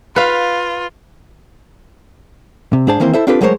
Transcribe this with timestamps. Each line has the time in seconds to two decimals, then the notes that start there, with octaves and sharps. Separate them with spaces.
0.16 F4 B4 F5
2.73 C3
2.87 G#2 D4 G#4 C5 A5
3.00 D#3 E3 A#3 C4 E4 C5
3.14 E4 A4 C5 E5
3.27 C4 D4 F4 G4 A4 B4
3.41 F#3 G#3 A3 A#4 C5 C#5